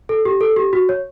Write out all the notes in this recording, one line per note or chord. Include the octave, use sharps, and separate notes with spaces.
A4
G4
A4
G4
F#4
C#5